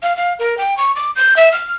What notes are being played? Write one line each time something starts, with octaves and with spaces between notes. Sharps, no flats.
F5
F5
A#4
G5
C#6
D6
G6
E5
F6